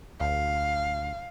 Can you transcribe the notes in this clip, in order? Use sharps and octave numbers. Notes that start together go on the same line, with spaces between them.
D2 F5